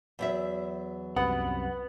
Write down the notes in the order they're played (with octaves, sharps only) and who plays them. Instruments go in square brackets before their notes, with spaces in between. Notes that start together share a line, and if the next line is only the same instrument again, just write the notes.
[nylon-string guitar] E2 F#3 E5
[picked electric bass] C2 F#2 C3 [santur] B3 [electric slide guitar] F#5